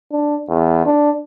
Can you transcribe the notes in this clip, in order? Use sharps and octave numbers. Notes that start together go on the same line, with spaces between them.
D4
E2
D4